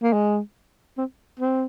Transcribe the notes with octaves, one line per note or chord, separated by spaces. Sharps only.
A#3
G#3
C4
C4